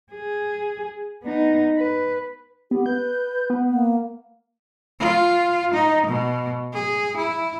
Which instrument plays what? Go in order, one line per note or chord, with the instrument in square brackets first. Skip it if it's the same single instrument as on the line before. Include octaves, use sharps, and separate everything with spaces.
[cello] G#4
B3 D#4
B4
[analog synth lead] B3 [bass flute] G4
[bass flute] B4 [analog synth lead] G6
[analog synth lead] B3
[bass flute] A#3
[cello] F4
D#4
B2
G#4
E4